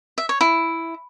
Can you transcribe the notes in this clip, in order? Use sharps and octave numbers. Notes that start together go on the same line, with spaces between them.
E5
C#5
E4